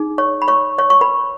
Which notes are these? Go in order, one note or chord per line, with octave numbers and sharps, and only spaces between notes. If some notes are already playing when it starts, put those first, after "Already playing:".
Already playing: D#4 G#4
C#5 C#6
B5
C#5 C#6
C#5 C#6
C#6
B4 B5